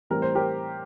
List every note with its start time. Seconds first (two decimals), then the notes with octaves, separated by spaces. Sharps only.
0.10 A2 E3 G3 C4 A#4
0.22 C5
0.35 G4 A#4